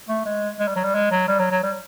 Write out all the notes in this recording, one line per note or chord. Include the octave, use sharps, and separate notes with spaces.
A3
G#3
G#3
G3
F#3
G3
G#3
F#3
G3
F#3
F#3
G3